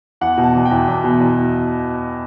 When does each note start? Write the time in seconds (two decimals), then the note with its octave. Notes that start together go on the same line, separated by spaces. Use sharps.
0.21 E2 F#5
0.38 B2
0.43 A5
0.55 E2
0.65 G5
0.71 E2
0.88 E2
1.04 B2
1.20 E2